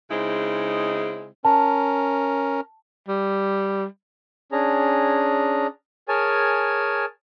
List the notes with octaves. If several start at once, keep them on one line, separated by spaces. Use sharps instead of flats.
C#3 G#3 C4 D#4 E4
C#4 A#4 A5
G3
C#4 D4 G#4 A#5
G#4 A#4 C#5 G#5 A5